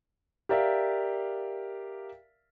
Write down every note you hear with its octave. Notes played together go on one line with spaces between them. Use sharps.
G4 A#4 D5 E5 F5